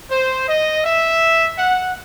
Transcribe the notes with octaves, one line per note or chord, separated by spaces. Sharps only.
C5
D#5
E5
F#5